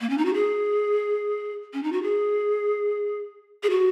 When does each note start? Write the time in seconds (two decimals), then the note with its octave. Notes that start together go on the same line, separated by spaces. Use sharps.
0.01 A#3
0.10 C#4
0.18 D#4
0.25 F#4
0.34 G#4
1.73 C#4
1.83 D#4
1.92 F#4
2.03 G#4
3.63 G#4
3.70 F#4